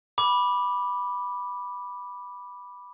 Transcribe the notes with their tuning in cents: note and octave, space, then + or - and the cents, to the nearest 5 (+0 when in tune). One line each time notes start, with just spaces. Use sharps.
B5 -5 D6 +0